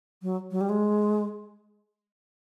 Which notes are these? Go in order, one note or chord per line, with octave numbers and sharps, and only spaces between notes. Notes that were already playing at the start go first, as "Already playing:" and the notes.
F#3
F#3
G3
G#3